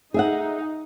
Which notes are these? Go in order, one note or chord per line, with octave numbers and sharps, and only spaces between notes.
D#4 G#4 E5 F#5